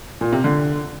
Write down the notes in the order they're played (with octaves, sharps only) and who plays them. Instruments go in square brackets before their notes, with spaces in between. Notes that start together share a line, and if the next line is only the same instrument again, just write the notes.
[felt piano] A#2
C3
D3